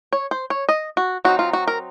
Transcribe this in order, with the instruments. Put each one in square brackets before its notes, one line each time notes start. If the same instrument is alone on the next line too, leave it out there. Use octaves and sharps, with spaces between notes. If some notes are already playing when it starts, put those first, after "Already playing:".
[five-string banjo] C#5
C5
C#5
D#5
F#4
F#3 C4 D#4 F#4
F4
F#4
A#4